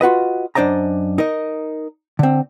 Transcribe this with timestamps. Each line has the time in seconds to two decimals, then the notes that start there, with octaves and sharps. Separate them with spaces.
0.01 F4 F#4 B4 D#5
0.55 F#2 D4 C5 D5 D#5 A#5
1.18 D#4 A#4 D#5
2.19 D3 C4